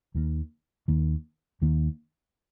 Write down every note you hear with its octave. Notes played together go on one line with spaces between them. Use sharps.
D#2 D#3 A#3
D#2 D#3 A#3
D#2 D#3 A#3